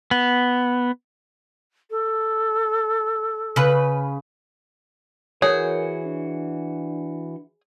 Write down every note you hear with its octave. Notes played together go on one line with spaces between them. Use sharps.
B3
A4
C#3 B4
E3 F#4 G#4 A#4 C#5 G6
D4